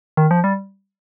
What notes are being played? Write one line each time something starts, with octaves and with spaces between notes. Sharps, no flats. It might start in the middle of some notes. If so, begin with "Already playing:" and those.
D#3
F3
G3